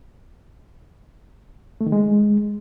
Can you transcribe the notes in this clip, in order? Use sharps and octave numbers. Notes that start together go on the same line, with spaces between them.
A3
D#3
G#3